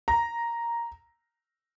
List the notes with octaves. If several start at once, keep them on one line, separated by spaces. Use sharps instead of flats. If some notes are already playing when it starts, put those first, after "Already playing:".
A#5